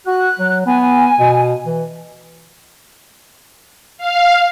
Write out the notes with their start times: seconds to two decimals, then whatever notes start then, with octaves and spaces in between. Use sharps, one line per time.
0.07 F#4 F#6
0.39 F#3
0.66 B3 G#5
1.19 B2
1.66 E3
3.98 F5